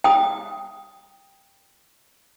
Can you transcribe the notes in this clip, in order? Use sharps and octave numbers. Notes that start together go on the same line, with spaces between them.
G5 D#6